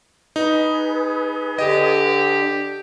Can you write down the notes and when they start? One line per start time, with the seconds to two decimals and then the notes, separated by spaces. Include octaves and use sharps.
0.36 D#4 G#4 B4
1.58 D3 G4 D#5